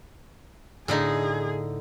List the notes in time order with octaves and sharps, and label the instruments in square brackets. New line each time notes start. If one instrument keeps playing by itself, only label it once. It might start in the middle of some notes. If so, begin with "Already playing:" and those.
[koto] A2 D3 D#4 [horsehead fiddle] G#4